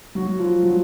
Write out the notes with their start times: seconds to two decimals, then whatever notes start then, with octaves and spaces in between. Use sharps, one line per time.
0.15 F#3 F#4
0.39 F3 F4
0.62 F#3 F#4